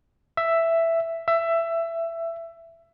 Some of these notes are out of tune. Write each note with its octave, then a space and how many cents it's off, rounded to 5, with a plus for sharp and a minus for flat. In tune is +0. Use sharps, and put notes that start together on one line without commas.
E5 +5
E5 +15